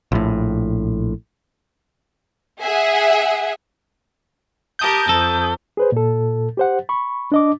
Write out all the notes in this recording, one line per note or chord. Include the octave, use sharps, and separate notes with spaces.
A#1 A2
G#4 E5 F#5
G4 A#4 A5 D#6 G6
F2 A4
G#4 B4 C5
A#2 A4
G4 C5 F#5
B5 C#6
D4 D#5 D6